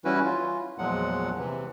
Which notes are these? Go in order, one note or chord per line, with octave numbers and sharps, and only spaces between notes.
E3 G3 C#4 E4 F#4 B4
F4
E2 A#2 F3 F#3 G#3 F#5
C3 E3